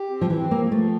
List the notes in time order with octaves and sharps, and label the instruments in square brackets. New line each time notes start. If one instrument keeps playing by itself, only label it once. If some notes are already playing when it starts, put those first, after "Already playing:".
Already playing: [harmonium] G4
C4
[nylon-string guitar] F3
[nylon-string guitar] E3 [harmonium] C4
[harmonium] F3 [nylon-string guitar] A#3
[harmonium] F3 [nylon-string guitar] A3